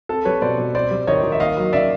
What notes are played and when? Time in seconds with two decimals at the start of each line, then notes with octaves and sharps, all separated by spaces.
0.09 C4 A4
0.25 G3 B4 C#5
0.42 B2 C5 D5
0.58 B2
0.75 C4 C5 D5
0.91 G3
1.07 D#3 C#5 D#5
1.23 D#3
1.32 E5
1.40 A#3 D#5 F5
1.57 F#3
1.73 C#3 D5 E5